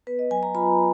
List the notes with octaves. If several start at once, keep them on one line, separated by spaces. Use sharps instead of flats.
B3 B4
D#5
F#3 G#5
A#5
F4 B5